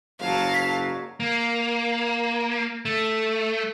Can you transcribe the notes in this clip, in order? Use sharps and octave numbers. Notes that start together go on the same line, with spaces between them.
F#1 G#2 F#3 F5 A5
B6
A#3
A3